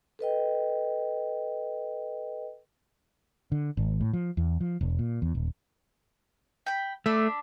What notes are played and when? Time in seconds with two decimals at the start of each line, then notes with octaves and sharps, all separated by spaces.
0.19 A4 B4 D#5 G5
3.52 D3
3.77 G#1
4.01 A2
4.13 F3
4.37 E2
4.61 F3
4.81 E1
4.99 A#2
5.22 E2
5.35 D#1
6.66 G5 B5
7.06 A3 D4 B5 E6